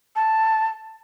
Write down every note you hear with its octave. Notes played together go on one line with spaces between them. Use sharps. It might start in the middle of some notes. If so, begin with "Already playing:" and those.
A5